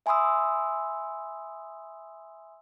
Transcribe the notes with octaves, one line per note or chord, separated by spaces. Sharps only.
E5 G#5 B5 C6 D#6 E6